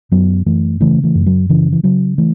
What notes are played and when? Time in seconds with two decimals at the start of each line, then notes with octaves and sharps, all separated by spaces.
0.11 F#2 F#3 B3
0.46 F#2 E3 A3
0.80 C#3 E3 A3
1.04 E3 A3
1.15 F#2
1.26 F#3
1.49 C#3 E3
1.72 E3
1.83 C#3 F#3
2.18 E3 A3